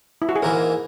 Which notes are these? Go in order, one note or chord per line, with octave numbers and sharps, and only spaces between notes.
E4
F#4
G#4
G#2 E3 A#3 A#4